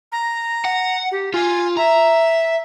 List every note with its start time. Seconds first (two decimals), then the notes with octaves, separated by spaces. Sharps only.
0.12 A#5
0.65 F#5
1.11 G4
1.34 F4 G#5
1.77 E5 A#5